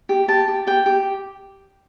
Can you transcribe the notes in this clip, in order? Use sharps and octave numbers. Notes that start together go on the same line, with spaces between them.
G4
G4 A5
G4
G4 G5
G4